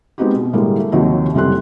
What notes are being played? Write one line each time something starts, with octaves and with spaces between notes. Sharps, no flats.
G#3 B3 C4 D#4 F#4 G4
B2
A2 D3 G3 G#3 A#3
A3
D#2 C3 F3 F#3 D#4
F#1 C3 G3 A4 C6 F#6